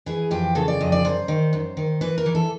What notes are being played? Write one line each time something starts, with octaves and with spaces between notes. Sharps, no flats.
E3 G#4
F2 G4
C#3 A4
D5
F2 D#5
D5
F#2 C5
D#3
F#2
D#3
E3 B4
A#4
E3
A4